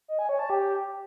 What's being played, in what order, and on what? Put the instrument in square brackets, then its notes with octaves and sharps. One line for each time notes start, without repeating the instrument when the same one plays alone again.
[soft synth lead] D#5
G#5
C#5
A5
G4